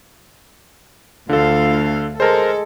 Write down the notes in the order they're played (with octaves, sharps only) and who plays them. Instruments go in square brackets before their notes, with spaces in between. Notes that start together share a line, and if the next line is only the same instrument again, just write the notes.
[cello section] D2 F5 [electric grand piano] D3 A4 [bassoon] F4
[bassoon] G#3 [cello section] A4 [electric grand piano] A#4 C5